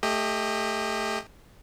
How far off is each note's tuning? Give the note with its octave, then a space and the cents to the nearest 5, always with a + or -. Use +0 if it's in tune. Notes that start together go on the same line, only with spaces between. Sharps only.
A3 +5 G4 +25 D#5 +0